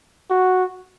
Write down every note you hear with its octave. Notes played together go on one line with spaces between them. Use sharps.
F#4